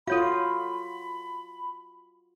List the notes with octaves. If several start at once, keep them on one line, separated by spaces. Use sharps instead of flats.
F4 F#4 A4 C#5 F5 B5